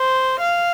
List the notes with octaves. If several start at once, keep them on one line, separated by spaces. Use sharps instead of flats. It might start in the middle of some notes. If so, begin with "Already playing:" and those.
Already playing: C5
F5